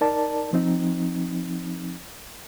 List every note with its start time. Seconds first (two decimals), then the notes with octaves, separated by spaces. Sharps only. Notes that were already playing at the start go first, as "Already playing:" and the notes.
0.01 D#4 A#4 D5 A5
0.53 F3 C4 D#4